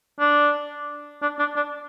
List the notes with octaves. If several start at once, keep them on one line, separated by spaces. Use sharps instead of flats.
D4
D4
D4
D4